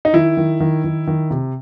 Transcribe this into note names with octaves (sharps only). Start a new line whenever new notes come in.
D#4
D#3 E4
D#3
D#3
D#3
D#3
C3